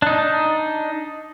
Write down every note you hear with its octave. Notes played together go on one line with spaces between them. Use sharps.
D4 D#4